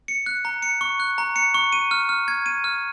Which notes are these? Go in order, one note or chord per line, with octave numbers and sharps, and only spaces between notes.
C#7
F#6
A#5
C#7
C#6
F#6
A#5
C#7
C#6
D#7
F6
F6
G#6
D#7
F6